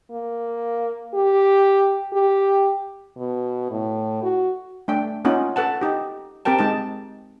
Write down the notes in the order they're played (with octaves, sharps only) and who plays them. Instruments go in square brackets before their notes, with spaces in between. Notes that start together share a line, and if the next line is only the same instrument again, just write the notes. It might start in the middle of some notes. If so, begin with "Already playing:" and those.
[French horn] A#3
G4
G4
B2
A2
F#4
[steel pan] A3 D4 G5
A#3 C#4 D#4 F4 F#5
A4 B4 F#5 A5
D#4 G4
C4 G4 A#4 G5 A5
G#3 D#4 A5